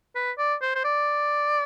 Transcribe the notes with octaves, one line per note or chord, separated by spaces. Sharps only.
B4
D5
C5
C5
D5